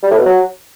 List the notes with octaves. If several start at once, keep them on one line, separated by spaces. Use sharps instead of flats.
G3
A2
B2
F#3